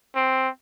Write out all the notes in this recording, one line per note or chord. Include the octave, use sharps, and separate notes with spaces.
C4